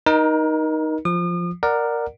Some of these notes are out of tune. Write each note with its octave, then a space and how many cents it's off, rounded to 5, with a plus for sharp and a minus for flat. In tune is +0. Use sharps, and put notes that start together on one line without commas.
D#4 +0 A#4 +30
F3 +0 D#6 -40
A#4 +0 D5 +15 F#5 +0